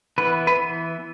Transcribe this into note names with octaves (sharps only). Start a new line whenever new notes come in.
E3 B3 B4
B4